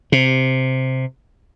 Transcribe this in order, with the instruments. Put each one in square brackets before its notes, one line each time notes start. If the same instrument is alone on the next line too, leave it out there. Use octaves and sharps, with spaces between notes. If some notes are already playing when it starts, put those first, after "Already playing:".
[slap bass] C3